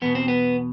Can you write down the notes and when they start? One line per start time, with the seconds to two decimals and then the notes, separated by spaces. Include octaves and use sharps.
0.02 E2 B2 B3
0.15 C4
0.28 B3